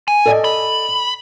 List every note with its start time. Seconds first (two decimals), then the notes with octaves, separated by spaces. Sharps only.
0.08 G#5
0.26 A4 D5 D#5
0.44 B5